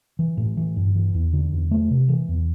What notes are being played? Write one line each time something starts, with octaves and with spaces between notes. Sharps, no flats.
E3
A2
E3
G2
E3
E2
D3
E2
A3
C3
E3
E2